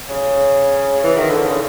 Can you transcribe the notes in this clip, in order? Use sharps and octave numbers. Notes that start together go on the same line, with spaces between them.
C#3
E3
D#3
D3
C#3